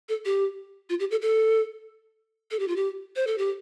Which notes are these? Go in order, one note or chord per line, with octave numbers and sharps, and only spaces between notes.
A4
G4
F4
G4
A4
A4
A4
G4
F4
G4
C5
A4
G4